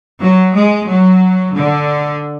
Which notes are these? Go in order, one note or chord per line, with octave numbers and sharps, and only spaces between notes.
F#3
G#3
F#3
D3